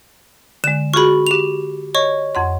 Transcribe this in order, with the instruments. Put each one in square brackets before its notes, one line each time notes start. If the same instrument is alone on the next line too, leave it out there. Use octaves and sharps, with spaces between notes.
[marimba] D3 G#3 [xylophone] E7
[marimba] F4 F#4 G#4 [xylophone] B5 C#6
[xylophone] G4 F7
C#5 D#5 C#6
[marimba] F2 F#5 C6